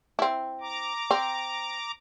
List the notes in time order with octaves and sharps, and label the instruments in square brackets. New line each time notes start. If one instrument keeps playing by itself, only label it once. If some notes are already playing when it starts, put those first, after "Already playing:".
[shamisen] C4 E4
[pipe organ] A#5 D6
[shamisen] C4